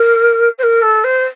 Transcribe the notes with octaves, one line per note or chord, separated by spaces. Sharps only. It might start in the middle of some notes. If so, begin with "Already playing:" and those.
Already playing: A#4
C5
A#4
A4
C5